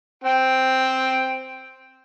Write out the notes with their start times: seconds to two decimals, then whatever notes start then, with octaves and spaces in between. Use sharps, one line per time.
0.24 C4 G5